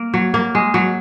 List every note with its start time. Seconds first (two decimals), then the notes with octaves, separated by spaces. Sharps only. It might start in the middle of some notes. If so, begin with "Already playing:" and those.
Already playing: A#3
0.14 F#3
0.34 A#3
0.55 G#3
0.74 F#3